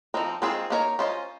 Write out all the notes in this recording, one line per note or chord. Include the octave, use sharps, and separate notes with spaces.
F3 C4 D#4 A#4
D#3 G#3 C4 F4 G#4
A#3 D#4 A#4 C#5
C#4 F4 C5 D#5